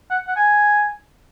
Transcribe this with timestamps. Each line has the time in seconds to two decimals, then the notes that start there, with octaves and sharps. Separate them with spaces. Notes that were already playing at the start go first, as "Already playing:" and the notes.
0.10 F#5
0.28 F#5
0.36 G#5